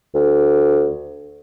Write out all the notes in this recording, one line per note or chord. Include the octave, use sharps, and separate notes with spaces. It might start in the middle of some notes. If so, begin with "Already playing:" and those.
D2